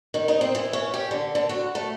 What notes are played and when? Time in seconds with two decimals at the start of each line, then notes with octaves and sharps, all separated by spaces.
0.14 D#3
0.28 D#4
0.41 C4
0.55 E3
0.73 C#4
0.94 G4
1.11 D3
1.35 D3
1.49 F#4
1.75 A3